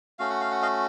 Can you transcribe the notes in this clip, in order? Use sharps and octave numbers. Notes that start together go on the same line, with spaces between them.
A3 C#4 F#4 F5
F#5
F5
F#5
D#5 F5